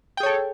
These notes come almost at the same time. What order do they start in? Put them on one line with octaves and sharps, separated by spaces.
G5 G#4 C#5 A4